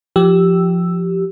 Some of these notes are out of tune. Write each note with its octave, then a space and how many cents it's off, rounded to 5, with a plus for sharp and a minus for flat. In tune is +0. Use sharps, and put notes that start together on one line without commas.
F3 +0 G4 -15 E6 +0